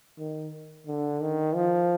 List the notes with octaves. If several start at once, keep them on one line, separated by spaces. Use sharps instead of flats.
D#3
D3
D#3
F3